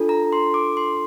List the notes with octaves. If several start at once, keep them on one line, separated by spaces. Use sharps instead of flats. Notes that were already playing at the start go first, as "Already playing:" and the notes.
Already playing: D4 F4 A4
A#5
C6
D6
C6